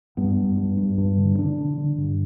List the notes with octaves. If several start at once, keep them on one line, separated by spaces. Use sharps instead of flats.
G2 B3
G2
G2
G2
G2
D3
D3 D4
D3
D3
G2